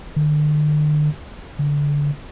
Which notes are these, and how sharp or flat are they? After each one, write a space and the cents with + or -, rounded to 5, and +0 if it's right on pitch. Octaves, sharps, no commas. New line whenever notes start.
D3 +40
D3 -20